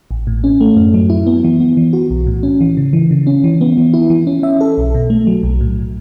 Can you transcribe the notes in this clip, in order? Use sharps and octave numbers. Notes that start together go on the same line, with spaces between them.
A1
A2
C#4
A3
F#2
F#3
E4
B3
E3
B3
E3
F#4
B1
A2
C#4
E3
C#3
E3
C#3
C#4
E3
B3
E3
E4
E3
C#4
E5
A4
B1
B2
A3
F#3
B1
A2